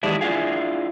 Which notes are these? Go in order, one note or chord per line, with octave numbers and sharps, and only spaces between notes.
D#3 E3 G#3 D4 E4 G4
D4 E4 F4 G#4